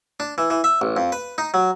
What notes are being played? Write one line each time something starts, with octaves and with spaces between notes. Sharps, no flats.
D4
E3
E3
E5
A1
F2
B4
D#4
F#3